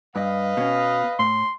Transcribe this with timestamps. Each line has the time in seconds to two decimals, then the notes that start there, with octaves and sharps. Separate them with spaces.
0.16 G2 B4 D#5 F5
0.57 B2 C#4
1.19 A2 C6